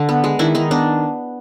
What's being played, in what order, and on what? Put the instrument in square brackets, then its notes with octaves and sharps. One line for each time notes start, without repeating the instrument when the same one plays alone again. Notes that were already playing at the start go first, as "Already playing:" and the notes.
Already playing: [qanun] D3
B3
G#3
D#3 D4 E4
D#3 D#4
B3 D4